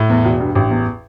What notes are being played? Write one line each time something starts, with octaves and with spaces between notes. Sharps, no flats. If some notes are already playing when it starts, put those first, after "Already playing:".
Already playing: A2
E2
E1
G2
A1
E2